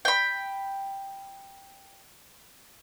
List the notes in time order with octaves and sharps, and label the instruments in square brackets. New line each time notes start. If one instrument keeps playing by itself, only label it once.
[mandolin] G5 B5